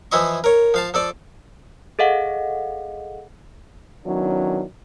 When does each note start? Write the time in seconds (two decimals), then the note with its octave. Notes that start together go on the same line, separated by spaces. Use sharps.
0.12 E3 F3 E4 D#5 C#6
0.44 A#4 C#5
0.74 F3 F5 A5
0.94 F3 A4 D5
1.99 G#4 A4 D#5 F5 F#5
4.05 D#3 F#3 B3 C#4 D4 E4